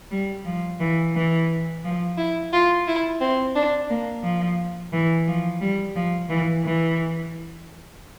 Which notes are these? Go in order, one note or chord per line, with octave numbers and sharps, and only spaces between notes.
G3
F3
E3
E3
F3
E4
F4
E4
C4
D4
A#3
F3
E3
F3
G3
F3
E3
E3